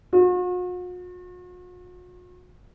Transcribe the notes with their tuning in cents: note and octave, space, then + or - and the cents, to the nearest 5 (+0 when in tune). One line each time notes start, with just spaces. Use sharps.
F#4 -45